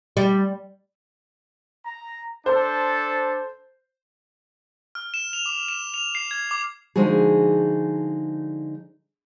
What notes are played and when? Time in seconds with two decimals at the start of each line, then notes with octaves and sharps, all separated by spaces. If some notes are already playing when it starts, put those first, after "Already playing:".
0.17 G3
1.85 A#5
2.46 D4 A4 C5
4.95 F6
5.14 E7
5.33 F7
5.46 D6
5.68 E7
5.94 F7
6.15 C7
6.31 G#6
6.51 D6
6.96 D3 F3 G#3 D#4 F#4 G#4